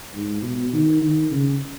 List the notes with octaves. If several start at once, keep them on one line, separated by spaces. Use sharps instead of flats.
G#2
B2
D#3
D#3
C#3